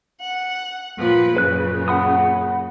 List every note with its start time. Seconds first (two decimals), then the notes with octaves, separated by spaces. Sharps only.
0.22 F#5
0.98 A#2 F3 B4
1.37 F#2 A#2 C#3 B4 F#6
1.88 F#5 B5 D#6